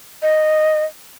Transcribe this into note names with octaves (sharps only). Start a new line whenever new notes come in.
D#5